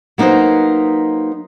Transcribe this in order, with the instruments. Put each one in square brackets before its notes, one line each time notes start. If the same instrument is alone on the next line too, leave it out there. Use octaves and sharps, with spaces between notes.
[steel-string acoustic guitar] F#3 A#3 D#4 B4 C5